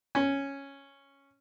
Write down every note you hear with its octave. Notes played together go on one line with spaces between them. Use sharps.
C#4